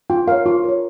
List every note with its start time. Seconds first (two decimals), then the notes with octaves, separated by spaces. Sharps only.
0.10 F4 G5
0.28 A#4 C#5 F5
0.46 F4
0.64 A#4 C#5